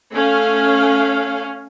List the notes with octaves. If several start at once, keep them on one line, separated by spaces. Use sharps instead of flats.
A3 C#4 F5